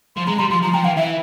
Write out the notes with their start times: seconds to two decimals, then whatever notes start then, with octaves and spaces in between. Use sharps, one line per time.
0.16 F3 C6
0.27 G#3 A#5
0.39 G3 C6
0.50 F3 C6
0.62 F3 A#5
0.74 F3 G5
0.85 E3 F5
0.97 E3 E5